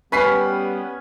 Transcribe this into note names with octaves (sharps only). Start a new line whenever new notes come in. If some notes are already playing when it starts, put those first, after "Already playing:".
G3 B3 C#4 G4 B4 B6 C7